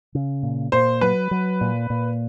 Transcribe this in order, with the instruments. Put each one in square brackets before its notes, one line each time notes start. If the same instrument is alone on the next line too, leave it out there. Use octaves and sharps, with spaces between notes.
[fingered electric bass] C#3
A#2
[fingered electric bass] A#2 [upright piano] C5
[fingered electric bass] F#3 [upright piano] B4
[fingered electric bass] F#3
A#2
A#2